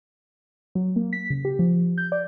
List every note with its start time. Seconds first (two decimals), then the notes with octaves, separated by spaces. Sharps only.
0.75 F#3
0.96 A#3
1.13 B6
1.30 C#3
1.45 G4
1.59 F3
1.98 G6
2.12 D5